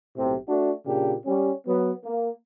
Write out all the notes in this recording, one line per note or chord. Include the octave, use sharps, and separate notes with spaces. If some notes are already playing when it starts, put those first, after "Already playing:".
B1 A2 C3
A3 D4 F#4
A#2 C#3 D4 G4
G3 C#4
F#3 B3
A#3